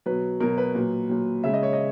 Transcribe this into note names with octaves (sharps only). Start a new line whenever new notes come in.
B2 F#3 B4
B2 F#3 A#4
B4
A#2 F#3
A#2 F#3
C#3 G#3 E5
D#5
C#5
D#5